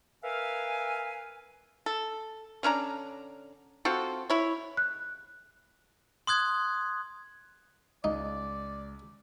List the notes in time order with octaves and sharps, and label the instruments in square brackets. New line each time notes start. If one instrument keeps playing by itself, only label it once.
[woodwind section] A#4 B4 E5 F5 G#5
[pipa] A4
D3 C#4 D4 A#5
C4 F4 F#4 A4
E4 C#5
[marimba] F#6
[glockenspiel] C6 D#6 F#6 G#6
[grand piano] C#2 [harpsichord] D#4 [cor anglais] D5